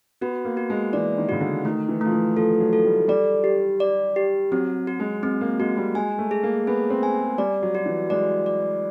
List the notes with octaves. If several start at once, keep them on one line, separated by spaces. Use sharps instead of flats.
B3 F#4
A#3
F#4
G#3
E3 D5
D#3
C#3 F#4
D3
D#3 A3
E3
F3 A3
E3
F3 A4
F#3
A4
G3
G3 D5
G4
D5
G4
F#3 C4
F#4
G#3
G#3 C4
A#3
G#3 F#4
G3
G#3 G#5
A3
G#4
A#3
B3 G#4
C4
G#5
G3 D5
F#3
F#4
E3
G#3 D5
D5